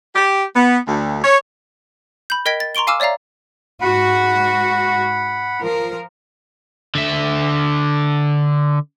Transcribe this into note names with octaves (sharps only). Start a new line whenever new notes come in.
G4
B3
D2
C#5
B5 G6
A#4 D#5 G5 G#6 B6 D7
A6
A#5 C6 C#6 D7 G7
F5 G#5 D6 E6 F6 E7
C#5 D5 E5 F5 A#5
G#2 F#4 F#5 B5
F3 A#4
D3 E5